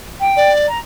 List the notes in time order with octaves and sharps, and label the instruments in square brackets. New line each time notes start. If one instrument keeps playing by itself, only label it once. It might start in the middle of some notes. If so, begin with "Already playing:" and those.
[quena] G5
[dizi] D5
[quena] A#5